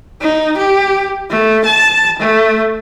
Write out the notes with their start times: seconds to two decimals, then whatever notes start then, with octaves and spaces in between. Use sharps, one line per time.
0.21 D#4
0.58 G4
1.30 A3
1.66 A5
2.20 A3